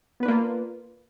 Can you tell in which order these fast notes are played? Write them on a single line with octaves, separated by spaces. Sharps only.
B3 B4 D4 A#3 F4